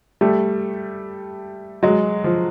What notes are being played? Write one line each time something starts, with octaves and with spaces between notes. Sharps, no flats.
G3 A3
F#3 G#3
F3